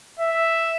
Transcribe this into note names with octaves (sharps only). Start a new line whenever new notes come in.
E5